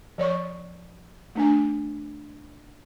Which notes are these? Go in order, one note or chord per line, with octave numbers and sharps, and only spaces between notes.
F3 C#5 D5 C#6
A3 D4 G#5